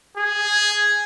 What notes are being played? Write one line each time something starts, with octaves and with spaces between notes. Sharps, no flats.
G#4